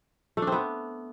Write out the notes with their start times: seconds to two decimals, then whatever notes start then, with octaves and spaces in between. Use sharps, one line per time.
0.37 A3
0.42 D4
0.47 C4
0.52 B3